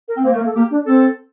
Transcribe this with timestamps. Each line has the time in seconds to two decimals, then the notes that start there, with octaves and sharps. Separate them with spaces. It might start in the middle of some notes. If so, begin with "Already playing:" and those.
0.08 A#4
0.16 C4
0.24 A#3 C5
0.33 A3 A#4
0.40 A#3
0.45 A4
0.55 A#3 G4
0.71 D4
0.86 C4 A4